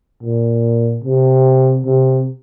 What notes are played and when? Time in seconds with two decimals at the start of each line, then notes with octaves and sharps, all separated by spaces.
0.23 A#2
1.04 C3
1.86 C3